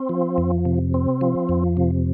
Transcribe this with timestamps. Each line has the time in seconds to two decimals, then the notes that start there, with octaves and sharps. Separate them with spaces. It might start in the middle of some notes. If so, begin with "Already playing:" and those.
Already playing: C4
0.09 F3
0.38 F2
0.65 C3
0.94 C4
1.21 F3
1.49 F2
1.77 C3